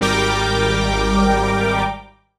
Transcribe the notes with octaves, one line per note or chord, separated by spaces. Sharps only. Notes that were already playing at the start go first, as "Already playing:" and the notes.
G#1 G3 A#4 G5 D6